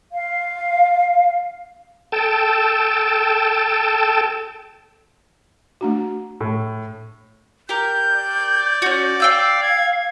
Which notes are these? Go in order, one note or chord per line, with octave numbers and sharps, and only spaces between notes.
F5
A4 G5 A5
A3 D4 F#4
A2
G4 A#4 G6
D5
C#4 F#4
F5 G5 E6 G6
G#6